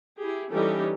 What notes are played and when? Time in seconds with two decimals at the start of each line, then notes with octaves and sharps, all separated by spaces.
0.18 E4 G4 G#4
0.52 E3 G3 C#4 D#4 G4 A4